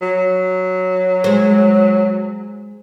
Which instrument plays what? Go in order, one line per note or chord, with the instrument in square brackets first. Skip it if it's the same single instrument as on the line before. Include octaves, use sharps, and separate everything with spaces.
[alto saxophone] F#3
[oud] G#3 C5